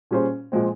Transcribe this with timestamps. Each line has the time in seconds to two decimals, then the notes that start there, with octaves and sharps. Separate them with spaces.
0.11 A#2 G3 C#4 G#4 C5
0.52 A#2 F3 G#3 C4